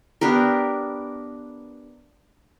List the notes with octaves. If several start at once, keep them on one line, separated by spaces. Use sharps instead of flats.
B3 D4 G4 A#4